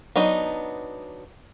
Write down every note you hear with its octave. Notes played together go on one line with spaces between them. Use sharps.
F#3 B3 D4 D#4